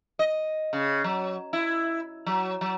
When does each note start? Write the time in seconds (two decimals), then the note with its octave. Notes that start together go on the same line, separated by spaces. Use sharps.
0.19 D#5
0.73 C#3
1.04 F#3
1.53 E4
2.26 F#3
2.61 F#3